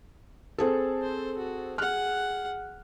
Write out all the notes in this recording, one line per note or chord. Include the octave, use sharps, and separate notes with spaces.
C4 G#4 A4
C5
F#4
G#4 F#5 F6 F#6